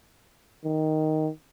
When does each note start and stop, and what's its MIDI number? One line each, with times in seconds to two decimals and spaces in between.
0.65 1.29 51